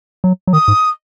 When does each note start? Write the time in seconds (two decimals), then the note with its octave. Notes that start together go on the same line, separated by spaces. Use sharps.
0.24 F#3
0.47 F#3
0.53 D#3 D#6
0.68 G#2